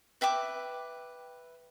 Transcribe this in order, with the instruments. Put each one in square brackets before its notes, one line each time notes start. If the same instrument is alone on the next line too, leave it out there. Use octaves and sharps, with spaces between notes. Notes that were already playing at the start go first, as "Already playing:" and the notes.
[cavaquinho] B4 E5 G5 D6